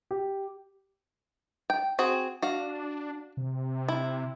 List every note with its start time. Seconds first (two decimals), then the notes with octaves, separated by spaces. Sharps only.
0.11 G4
1.70 G5
1.99 C4 F#4 G#4
2.42 D4 F#4 F5
3.37 C3
3.88 E4